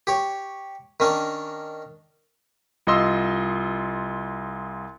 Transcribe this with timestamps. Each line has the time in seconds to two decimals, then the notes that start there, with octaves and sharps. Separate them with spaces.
0.07 G4 C#5
1.00 D#3 C#4 D4
2.87 C2 F4 D#5 C6 E6